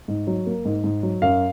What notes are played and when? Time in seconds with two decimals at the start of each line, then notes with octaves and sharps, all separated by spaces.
0.08 G#2
0.27 F#3
0.46 A#3
0.65 G#2
0.84 G#2
1.03 F#3
1.22 F#2 F5